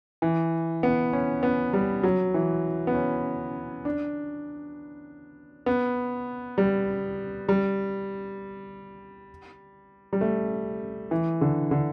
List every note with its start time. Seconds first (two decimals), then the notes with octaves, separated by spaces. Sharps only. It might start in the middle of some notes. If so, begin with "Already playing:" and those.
0.22 E3
0.83 B3
1.13 C#4
1.43 B3
1.73 G3
2.04 F#3
2.34 E3
2.87 B3
2.94 C#4
3.85 D4
5.66 B3
6.58 G3
7.49 G3
10.13 G3
10.21 A3
11.11 E3
11.41 D3
11.71 D3